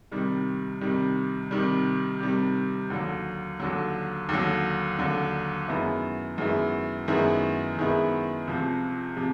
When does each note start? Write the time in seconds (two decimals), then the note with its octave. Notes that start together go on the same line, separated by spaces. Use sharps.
0.12 C3 D#3 G3
0.81 C3 D#3 G3
1.51 C3 D#3 G3
2.20 C3 D#3 G3
2.90 D#2 D3 F#3
3.60 D#2 D3 F#3
4.29 D#2 D3 F#3
4.99 D#2 D3 F#3
5.68 F#2 D#3 G#3 B3 E4
6.38 F#2 D#3 G#3 B3 E4
7.08 F#2 D#3 G#3 B3 E4
7.77 F#2 D#3 G#3 B3 E4
8.47 C#2 C3 F3
9.17 C3 F3